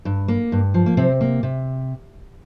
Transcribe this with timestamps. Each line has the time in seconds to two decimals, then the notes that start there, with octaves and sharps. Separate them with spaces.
0.05 G2
0.28 A#3
0.52 G2
0.74 F3
0.86 A#3
0.97 C3 C4
1.21 A#3
1.43 C3